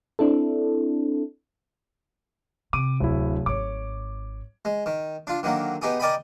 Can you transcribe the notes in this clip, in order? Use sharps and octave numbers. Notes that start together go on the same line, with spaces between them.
C4 D4 E4 A4
C3 D6 D#7
D1 E4
G#1 G#2 C#5 D6
G#3
D#3
D4 F4
D3 D#3 F#3 A#3
B3 D#4 G4 G#4
A#4 D5 D#5 G5 G#5 B5